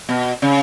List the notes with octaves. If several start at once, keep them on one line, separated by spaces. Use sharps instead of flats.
B2
C#3